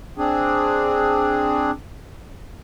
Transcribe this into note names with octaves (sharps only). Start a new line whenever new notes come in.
C4 D4 G#4